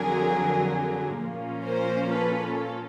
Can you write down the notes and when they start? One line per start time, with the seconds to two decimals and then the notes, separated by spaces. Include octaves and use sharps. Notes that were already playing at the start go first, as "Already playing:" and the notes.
Already playing: F2 D3 F#3 G#4 A#4
1.21 A#2 F3 A#3 C#4 F4
1.67 A#4 C5
2.12 A4 B4
2.43 A4